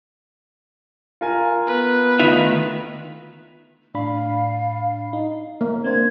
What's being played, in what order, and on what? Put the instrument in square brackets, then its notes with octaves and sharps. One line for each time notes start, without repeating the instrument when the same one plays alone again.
[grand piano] F4 A#4 G#5
[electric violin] B3 B4
[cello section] D2 D#3 [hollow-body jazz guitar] D#4 F4 E5 [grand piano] B6 D#7 F7
[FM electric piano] A2 D4 B5 [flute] F5
[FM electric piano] D#4
[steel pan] A#3
[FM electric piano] C4 D4 C5 [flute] G#6